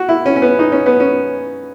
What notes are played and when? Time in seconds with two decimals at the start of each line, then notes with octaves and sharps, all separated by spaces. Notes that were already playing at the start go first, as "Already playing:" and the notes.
Already playing: F#4
0.09 E4
0.26 C#4
0.36 C#4
0.42 B3
0.59 D#4
0.72 C#4
0.86 B3
1.00 C#4